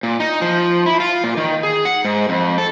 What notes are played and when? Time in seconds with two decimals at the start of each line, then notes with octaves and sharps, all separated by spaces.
0.03 A#2
0.20 D#4
0.41 F3
0.86 E4
1.00 F4
1.24 A#2
1.37 D#3
1.63 G#4
1.85 F#5
2.05 G#2
2.29 F2
2.58 A4